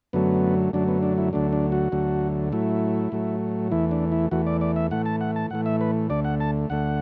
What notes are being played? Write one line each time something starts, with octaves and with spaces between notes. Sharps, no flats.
F#2 D3 F#3 A3 B3
F#2 D3 F#3 A3 D4
B3
D4
E4
D2 D3 F#3 A3 D4
D4
F#4
D2 D3 F#3 A3
A2 F#3 A3 E4
A2 F#3 A3
E2 E3 A3 E4
D4
E4
E2 E3 A3 F#4
D5
D5
E5
A2 E3 A3 F#5
A5
F#5
A5
A2 E3 A3 F#5
E5
B4
D2 D3 A3 D5
F#5
A5
D2 D3 A3 F#5